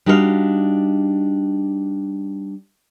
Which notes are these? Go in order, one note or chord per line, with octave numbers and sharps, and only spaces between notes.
G3 D4 D#4 F#4 B4 F5